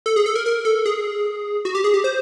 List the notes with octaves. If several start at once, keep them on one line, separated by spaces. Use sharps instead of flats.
A4
G#4
A4
A#4
A#4
A4
G#4
F#4
G4
G#4
G4
C5